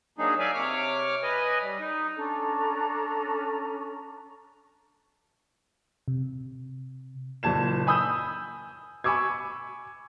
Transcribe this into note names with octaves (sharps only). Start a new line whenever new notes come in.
F#3 G#3 A#3 D4 D#4 G#4
D5 E5 F5 G#5
C3 C#5 D6 F6
B4 D#5 G#5
G3
D#4
C#4 D4 A4 A#5
C3
F#1 A#2 A5 G#6 E7
G#5 B5 D#6 E6 G6
G#5 B5 C#6 D6 E6 G#6